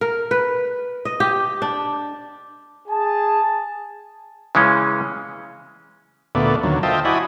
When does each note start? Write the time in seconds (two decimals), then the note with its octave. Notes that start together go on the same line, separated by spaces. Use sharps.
0.01 A#4
0.31 B4
1.05 D#5
1.20 G4
1.62 D4
2.88 G#4 A5
4.55 C#3 E3 G#3 C#4
6.35 D2 A#2 A3 B3 D5
6.63 D#2 D3 F#3
6.83 F4 C5 D#5 E5 G5 A5
7.05 E4 F#4 D5 D#5 G#5 B5